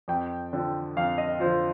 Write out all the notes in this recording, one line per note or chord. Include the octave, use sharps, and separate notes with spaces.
F2 G5
D3 F3
F2 F5
D#5
D3 F3 C5